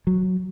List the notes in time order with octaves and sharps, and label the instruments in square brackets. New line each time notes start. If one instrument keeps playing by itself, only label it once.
[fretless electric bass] F#3